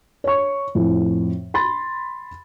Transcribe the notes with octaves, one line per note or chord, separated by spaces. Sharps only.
C#5 C#6
F2 A2
B5 C6 A6